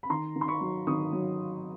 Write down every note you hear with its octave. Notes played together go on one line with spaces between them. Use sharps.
B5
D#3 A#5 C6
D#3
C6
B5 C#6
F#3
D#3 C#6 D#6
F#3